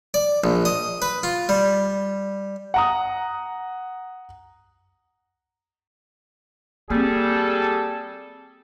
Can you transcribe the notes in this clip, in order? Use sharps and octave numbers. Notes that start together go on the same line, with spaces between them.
D5
A#1
D#5
B4
F4
G3
F#5 A#5 D#6
G3 A#3 C4 G#4 A4